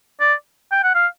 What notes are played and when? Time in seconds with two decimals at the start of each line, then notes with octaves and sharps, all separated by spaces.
0.20 D5
0.72 G5
0.83 F#5
0.95 F5